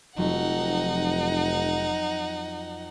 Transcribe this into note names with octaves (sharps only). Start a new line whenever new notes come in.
F1 F2 F#3 D#4 F#5